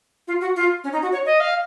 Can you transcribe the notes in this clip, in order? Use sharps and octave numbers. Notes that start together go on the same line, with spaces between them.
F4
F#4
F4
C#4
D#4
F#4
C#5
D#5
F5